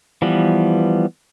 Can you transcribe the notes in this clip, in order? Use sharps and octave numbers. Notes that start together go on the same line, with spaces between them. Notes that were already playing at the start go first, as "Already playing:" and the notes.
E3 F3 G3 B3